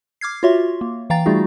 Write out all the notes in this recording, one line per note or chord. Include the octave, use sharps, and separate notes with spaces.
D6 F6 G#6 C7
F4 F#4 C#5 E5 C6
A#3
E3 F5 G5 A#5 A6
G3 A3 D#4 F4 F#4 G#4